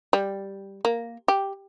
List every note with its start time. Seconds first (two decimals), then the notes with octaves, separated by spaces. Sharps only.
0.13 G3
0.85 A#3
1.28 G4